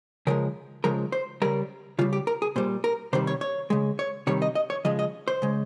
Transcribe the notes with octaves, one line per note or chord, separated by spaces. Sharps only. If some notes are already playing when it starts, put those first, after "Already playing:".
C#3 F3 G#3 A#4
C#3 F3 G#3 A#4
C5
C#3 G3 A#4
C#3 G3 F4
G4
A#4
G#4
A#2 G3 C5
A#4
C3 D#3 G3 C5
C#5
C#5
C#3 G#3
C#5
C3 D#3 G3 C#5
D#5
D#5
C#5
C#3 F3 G#3 D#5
D#5
C5
C#3 G#3